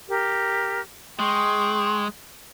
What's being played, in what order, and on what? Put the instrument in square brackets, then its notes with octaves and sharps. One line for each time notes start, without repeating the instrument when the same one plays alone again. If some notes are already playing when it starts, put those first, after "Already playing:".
[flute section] G4 A#4
[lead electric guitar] G#3 [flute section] G5 C6 C#6